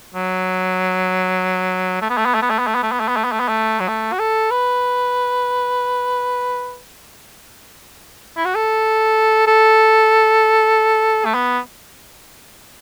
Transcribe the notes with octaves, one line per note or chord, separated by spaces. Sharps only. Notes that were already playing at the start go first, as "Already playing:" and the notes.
F#3
A3
B3
A3
B3
A3
B3
A3
B3
A3
B3
A3
B3
A3
B3
A3
B3
A3
B3
A3
F#3
A3
F#4
A4
B4
E4
F#4
A4
A4
A3
B3